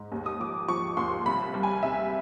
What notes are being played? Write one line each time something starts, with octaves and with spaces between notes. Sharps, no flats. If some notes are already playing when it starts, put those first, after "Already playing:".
Already playing: G#2
D#2
D#6
F3 D6
F3 C#6
D#2 C6
C2 B5
G3
G#5
C2 E5